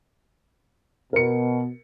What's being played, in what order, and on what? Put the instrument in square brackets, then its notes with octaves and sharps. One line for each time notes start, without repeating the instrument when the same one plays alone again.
[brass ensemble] B2 [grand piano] A#4 C#7